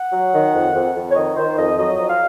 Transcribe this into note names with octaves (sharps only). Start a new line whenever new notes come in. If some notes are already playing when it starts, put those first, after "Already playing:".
Already playing: F#5
F#3
D#3
F2
F2
F2
C#5
D#3 D#5
D#3 C5
F2 D#5
F#3 D#5
F2
F5